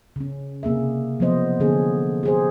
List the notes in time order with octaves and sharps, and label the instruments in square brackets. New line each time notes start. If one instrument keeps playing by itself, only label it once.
[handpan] C#3 C#4
C3 A#3 G#4 E5
F3 F#3 A#3 B3 C5 D#5
D3 A#3 B3 C#4 G#4 A4
G4 G#4 C5